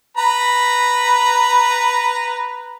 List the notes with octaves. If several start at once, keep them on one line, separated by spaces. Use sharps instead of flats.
B4 A#5 B5